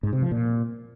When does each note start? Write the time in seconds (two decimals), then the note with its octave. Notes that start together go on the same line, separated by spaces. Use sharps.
0.03 G#2
0.13 C3
0.22 F3
0.31 A#2